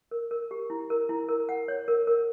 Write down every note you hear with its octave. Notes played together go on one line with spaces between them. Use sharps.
A#4
A#4
G4
E4
A#4
E4
A#4
F#5
C#5
A#4
A#4